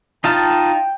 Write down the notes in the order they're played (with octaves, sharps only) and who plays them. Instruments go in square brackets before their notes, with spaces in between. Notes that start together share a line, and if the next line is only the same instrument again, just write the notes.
[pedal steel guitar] D#4 F4 A5 [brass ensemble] G5